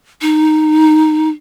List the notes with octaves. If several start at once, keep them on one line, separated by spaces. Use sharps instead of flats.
D#4